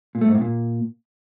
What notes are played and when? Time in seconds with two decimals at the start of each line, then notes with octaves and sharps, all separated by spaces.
0.15 A#2
0.21 A3
0.28 G#2
0.35 A2
0.41 A#2